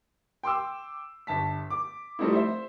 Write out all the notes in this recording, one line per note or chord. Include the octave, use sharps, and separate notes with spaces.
G5 C6 D6 E6
G1 A5 B6
D6
F3 G3 A3 C4 D#4 E4
C5 E5